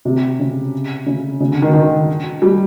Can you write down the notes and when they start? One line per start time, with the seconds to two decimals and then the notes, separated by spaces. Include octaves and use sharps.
0.05 C3
0.39 C#3
1.06 C#3
1.40 C#3
1.52 D3
1.62 D#3
1.74 D#3
2.42 G3